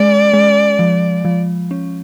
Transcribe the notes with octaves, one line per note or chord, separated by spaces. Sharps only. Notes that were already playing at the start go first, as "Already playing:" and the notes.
Already playing: G#3 C#4 D5
G#3
F3
F3
C#4